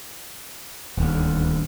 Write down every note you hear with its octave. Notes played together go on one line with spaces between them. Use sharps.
D#1 D2